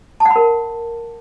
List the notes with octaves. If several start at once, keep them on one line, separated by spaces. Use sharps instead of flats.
A5
F#5
B5
A#4